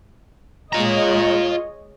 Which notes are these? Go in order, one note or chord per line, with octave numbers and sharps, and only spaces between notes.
G#3 F4 C#5 D#5 A#5